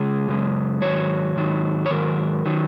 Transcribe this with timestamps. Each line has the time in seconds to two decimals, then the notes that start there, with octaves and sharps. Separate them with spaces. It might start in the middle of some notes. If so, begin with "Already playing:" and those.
Already playing: C#3 G#3 G#4
0.28 F#2 C#3 G#3
0.82 G#2 D#3 F#3 C#5
1.36 G#2 D#3 F#3
1.86 C#5
1.91 G#2 D#3 F#3 A#4
2.46 D#3 F#3